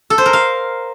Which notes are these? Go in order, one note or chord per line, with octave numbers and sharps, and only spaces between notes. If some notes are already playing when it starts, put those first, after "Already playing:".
A4
C5
A#4
F5